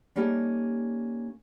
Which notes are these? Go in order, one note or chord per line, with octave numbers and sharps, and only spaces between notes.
G3 A#3 C#4 D#4 G4 A4